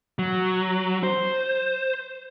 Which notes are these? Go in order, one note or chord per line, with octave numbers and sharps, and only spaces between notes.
F#3
C5